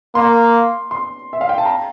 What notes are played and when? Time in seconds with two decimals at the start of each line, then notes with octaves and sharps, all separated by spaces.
0.15 A#3 C6
0.91 C6
1.33 E5
1.41 F5
1.49 G5
1.58 A5
1.66 A#5